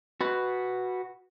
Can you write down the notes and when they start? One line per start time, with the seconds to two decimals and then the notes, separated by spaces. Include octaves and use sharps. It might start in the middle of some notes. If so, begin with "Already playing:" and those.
0.21 F#4 B4